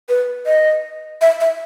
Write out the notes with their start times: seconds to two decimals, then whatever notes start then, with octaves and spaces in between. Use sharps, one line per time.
0.09 B4
0.46 D#5
1.21 E5
1.40 E5